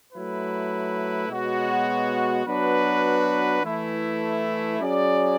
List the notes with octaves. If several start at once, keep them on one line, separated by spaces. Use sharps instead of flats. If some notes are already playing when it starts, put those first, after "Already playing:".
F#3 A3 E4 B4
B2 G#3 B3 F#4 C#5
F#3 B3 D4 F#4 B4
E3 A3 E4
F#3 C#4 G#4 D5